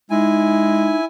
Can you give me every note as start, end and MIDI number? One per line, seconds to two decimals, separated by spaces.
0.10 0.93 56
0.10 0.99 63
0.10 1.05 64
0.10 1.05 80